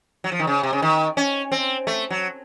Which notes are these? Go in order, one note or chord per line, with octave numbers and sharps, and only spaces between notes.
F#3
F3
D#3
C#3
C3
C#3
D#3
C#4
C4
A3
F#3